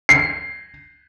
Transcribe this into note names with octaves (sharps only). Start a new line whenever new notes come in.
C7